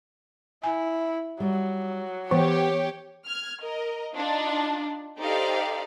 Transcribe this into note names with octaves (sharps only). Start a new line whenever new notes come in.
E4 G#5
F#3 G3
E3 B3 G4 C#5
F6 G#6
A#4 D#5
D4 D#4 F4
D#4 G4 A4 C5 D5 F5